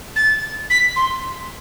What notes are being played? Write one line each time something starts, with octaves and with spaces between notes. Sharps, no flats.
A6
B6
C6